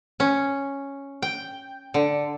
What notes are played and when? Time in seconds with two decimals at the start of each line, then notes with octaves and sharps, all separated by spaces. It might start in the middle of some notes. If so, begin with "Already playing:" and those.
0.20 C#4
1.22 G5
1.94 D3